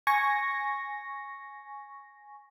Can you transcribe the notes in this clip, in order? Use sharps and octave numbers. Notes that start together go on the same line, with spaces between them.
G#5 C#6 A#6